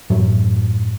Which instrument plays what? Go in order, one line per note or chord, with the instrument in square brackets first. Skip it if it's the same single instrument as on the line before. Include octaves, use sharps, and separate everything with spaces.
[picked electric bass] F#2 A2 F#3